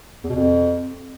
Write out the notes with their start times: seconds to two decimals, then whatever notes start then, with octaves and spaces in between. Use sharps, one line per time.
0.24 E2
0.30 B2
0.35 F2